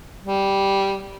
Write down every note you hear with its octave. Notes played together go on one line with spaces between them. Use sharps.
G3